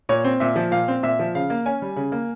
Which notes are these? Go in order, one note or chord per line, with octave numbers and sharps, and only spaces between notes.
A#2 C#5
C4
A#2 E5
F3
A#2 F5
C4
A#2 E5
F3
C#3 F5
A#3
C#4 G#5
G3
C#3
A#3